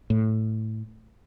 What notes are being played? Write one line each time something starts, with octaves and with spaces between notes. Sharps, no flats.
A2